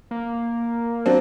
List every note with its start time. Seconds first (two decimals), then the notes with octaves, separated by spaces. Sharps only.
0.11 A#3
1.06 F#3 C4 D4